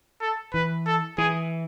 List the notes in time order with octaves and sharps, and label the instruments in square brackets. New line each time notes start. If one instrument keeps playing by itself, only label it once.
[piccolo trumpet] A4
[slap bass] E3 [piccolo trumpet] B4
[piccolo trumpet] A4
[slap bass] E3 [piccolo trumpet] G#4